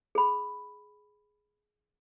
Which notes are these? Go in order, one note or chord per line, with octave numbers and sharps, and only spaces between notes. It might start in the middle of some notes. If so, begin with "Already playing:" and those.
G#4 B5